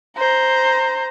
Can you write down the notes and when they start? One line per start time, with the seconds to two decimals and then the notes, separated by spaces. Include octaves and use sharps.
0.18 C5 A#5